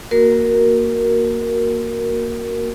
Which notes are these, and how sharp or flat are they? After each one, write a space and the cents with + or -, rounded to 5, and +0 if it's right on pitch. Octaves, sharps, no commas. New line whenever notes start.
A#3 +0 F#4 +0 A#4 +0